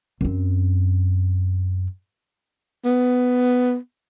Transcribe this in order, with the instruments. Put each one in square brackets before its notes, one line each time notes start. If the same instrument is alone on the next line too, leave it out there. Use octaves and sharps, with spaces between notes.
[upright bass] F#2 C4
[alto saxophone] B3